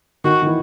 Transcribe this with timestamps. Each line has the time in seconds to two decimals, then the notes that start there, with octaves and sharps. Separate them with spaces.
0.24 D#3 F#4
0.42 D#3
0.47 E3